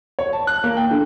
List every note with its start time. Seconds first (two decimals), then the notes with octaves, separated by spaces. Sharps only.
0.19 C#5
0.33 A5
0.47 F#6
0.64 A#3
0.77 G5
0.91 D3